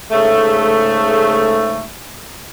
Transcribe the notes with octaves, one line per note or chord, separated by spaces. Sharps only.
G#2 C#3 A3